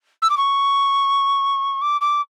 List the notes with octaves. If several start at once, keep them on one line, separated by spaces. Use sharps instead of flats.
E6
D6
C#6
D6
D6